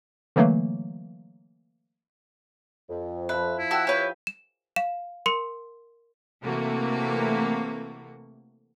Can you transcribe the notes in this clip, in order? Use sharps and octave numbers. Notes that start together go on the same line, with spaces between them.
D3 E3 F#3 A3 A#3
F2
F3 B4 E5
E4
F#4 G5 A5 E6
G4 B4 C#5
E7
F5 E7
A#4 C6 C#7
C3 E3 A3 A#3 F#4